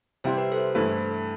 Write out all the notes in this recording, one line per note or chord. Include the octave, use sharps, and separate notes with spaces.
C3 G3 C4 E4 C5
B4
A4 C5
G2 E3 A3 E4 B4